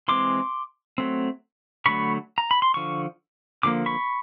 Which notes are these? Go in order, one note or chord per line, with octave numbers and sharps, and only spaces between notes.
E3 G#3 C4 C6 D6
F#3 A3 C4
D3 F#3 A3 B5 C#6
A#5
B5
C6
D3 F3 C#6
D3 F3 A#3 D6
B5 C#6